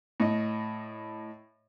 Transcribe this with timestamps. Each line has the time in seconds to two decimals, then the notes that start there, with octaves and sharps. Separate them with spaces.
0.20 A2 D#5